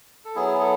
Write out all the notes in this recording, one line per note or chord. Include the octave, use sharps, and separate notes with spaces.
A4
F#3 B3 E4 G#4
A4